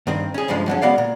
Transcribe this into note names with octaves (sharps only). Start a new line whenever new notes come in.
G2 D#3 C4
C#4 G#4
D2 G2 F3 G#3
F#2 D3 C#4
G#3 B3 F#4 D5 F5
A#2